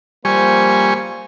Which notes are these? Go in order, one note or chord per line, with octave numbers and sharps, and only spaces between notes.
F3 G3 A#3 C5 G#5 C#6